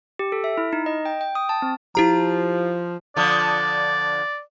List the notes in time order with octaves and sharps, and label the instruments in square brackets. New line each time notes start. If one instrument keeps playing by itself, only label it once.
[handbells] G4
A4
E5
E4
D#4
D#5
G5
G5
D#6
A5
C4
[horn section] F3 [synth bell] E4 G4 A#5
[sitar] D3 F3 [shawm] D5